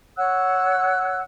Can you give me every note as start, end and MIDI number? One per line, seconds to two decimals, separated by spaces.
0.17 1.20 73
0.17 1.20 78
0.17 1.20 88
0.17 1.20 90